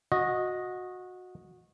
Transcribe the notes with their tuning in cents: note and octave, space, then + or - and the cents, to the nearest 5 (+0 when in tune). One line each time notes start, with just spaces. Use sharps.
F#4 -20 D#5 +0